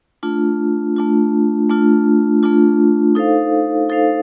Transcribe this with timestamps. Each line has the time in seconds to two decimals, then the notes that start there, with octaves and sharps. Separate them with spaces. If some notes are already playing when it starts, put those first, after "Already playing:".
0.23 A3 D4 F4
0.97 A3 D4 F4
1.70 A3 D4 F4
2.43 A3 D4 F4
3.15 D#4 A4 C5 F5
3.89 D#4 A4 C5 F5